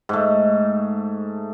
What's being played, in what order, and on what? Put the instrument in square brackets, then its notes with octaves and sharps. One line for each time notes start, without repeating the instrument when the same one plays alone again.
[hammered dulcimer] G#2 A3